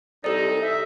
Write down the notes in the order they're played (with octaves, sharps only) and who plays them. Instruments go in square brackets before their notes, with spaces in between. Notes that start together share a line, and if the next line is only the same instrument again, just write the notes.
[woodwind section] C2 D#4 [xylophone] G4 A4 D5
[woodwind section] E5